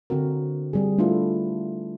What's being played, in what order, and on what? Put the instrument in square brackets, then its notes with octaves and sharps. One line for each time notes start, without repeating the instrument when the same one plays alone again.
[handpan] D3 C4 F#4 A#4
G3 C4 G#4
A3 D4 E4 F4 A4 B4